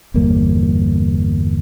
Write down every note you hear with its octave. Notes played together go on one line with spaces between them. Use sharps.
G1 E2 G3 A#3